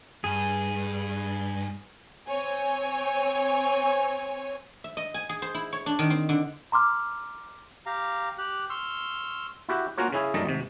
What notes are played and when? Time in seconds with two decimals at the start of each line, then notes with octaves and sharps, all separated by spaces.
0.24 G2 G#4 G#5
2.28 C4 C#5 G#5
4.84 E5
4.97 D#5
5.14 G#5
5.29 G#4
5.42 C5
5.54 E4
5.73 C#5
5.86 D4
5.99 D#3
6.10 C4
6.29 D3
6.72 A#5 C6 D6 F6
7.86 G4 F5 A#5
8.38 G4 F#6
8.70 C6 C#6 E6 F6
9.69 E4 F#4 G4
9.98 A#3 C#4 F4 F#4 A#4 C#5
10.12 C#3 C#4 E4 G#4
10.34 F#2 G3 A3 D#4 D#5 A5
10.46 G#1 C3